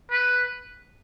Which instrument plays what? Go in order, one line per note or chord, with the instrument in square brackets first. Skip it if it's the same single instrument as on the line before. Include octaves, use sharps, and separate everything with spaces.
[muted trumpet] B4